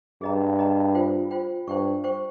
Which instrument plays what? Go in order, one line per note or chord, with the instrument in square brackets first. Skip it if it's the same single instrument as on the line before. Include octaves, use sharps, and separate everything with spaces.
[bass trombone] G2 [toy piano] G#4 D#5 A#5
[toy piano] G#4 D#5 A#5
F4 C5 G5
F4 C5 G5
[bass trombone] G2 [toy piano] C5 G5 C#6
[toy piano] C5 G5 C#6